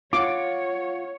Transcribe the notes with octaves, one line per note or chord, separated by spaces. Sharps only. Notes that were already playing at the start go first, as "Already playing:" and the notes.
F4 C#5 F5 F#5 D6